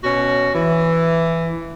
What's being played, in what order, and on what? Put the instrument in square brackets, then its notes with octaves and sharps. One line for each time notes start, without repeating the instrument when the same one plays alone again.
[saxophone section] B2 C#4 F#4
E3